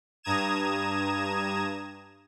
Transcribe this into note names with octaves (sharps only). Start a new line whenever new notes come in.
G2 A#5 D#6 G#6 E7